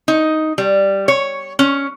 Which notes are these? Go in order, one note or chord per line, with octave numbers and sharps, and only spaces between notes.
D#4
G3
C#5
C#4